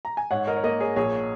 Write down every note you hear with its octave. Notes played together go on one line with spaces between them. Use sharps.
A#5
G#5
G#2 C#5 F#5
A#4 D#5
C#5
A#3 A#4 D#5
G#4 C#5
A#1 G#4 C#5